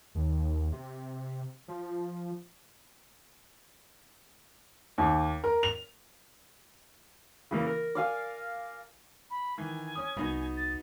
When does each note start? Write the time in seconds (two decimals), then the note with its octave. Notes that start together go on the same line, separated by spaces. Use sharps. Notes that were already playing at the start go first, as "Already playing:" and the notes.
0.15 D#2
0.72 C3
1.68 F3
4.98 D#2
5.44 A#4
5.63 F7
7.51 C#3 E3 A#3
7.67 A#4
7.95 D5 F5 G#5
9.30 B5
9.58 D#3 E3 G#5
9.95 C#4 D#6
10.17 C2 B3 D#4 F#4
10.57 A6